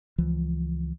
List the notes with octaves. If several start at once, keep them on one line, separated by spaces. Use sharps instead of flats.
C#2 E3 F3